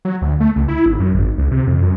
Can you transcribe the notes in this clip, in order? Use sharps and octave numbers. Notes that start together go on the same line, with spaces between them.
F#3
D2
A3
C#2
E4
G#1
F#2
G#1
C#2
C3
F2
F#2